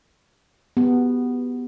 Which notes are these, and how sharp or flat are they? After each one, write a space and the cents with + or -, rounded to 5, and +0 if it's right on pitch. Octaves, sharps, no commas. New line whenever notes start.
B3 +0 G4 +15